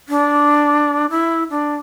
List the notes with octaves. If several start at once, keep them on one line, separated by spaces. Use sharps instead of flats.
D4
E4
D4